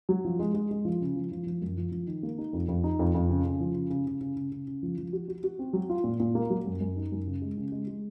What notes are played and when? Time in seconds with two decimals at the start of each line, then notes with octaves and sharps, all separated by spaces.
0.09 F#3
0.25 F3
0.39 G#3
0.54 G#3
0.71 G#3
0.85 F3
1.01 C#3
1.16 F3
1.32 F3
1.47 F3
1.62 F#2
1.77 F3
1.92 F3
2.07 D#3
2.23 A#3
2.38 D#4
2.53 F2
2.68 F2
2.84 D#4
2.99 F2
3.14 F2
3.29 C#3
3.45 C#3
3.60 F3
3.75 C#3
3.90 C#3
4.07 C#3
4.21 C#3
4.36 C#3
4.52 C#3
4.67 C#3
4.83 F3
4.98 F3
5.13 F#4
5.28 F#4
5.44 F#4
5.59 C4
5.73 F#3
5.89 F4
6.04 A#2
6.20 A#2
6.35 A#3
6.50 F#3
6.66 F#2
6.81 F#2
6.96 D#4
7.12 F#2
7.26 C#3
7.42 G#3
7.57 C#3
7.72 G#3
7.87 G#3